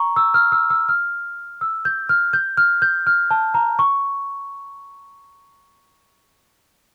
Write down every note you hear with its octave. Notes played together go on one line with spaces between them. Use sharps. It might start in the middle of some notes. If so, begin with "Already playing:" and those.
Already playing: A#5 C#6
E6
F6
E6
E6
F6
E6
G6
F6
G6
F6
G6
F6
A5
A#5
C#6